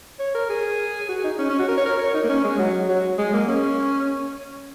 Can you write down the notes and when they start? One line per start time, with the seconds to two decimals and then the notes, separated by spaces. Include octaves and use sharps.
0.19 C#5
0.34 A#4
0.49 G#4
1.09 F#4
1.24 D#4
1.39 C#4
1.49 C#4
1.59 F#4
1.68 A#4
1.77 C#5
1.85 A#4
1.99 C#5
2.14 D#4
2.24 A#3
2.29 C#4
2.44 G#3
2.59 F#3
2.88 F#3
3.18 G#3
3.33 A#3
3.48 C#4